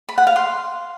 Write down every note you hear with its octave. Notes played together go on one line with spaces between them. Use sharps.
B5
F#5
F5
C6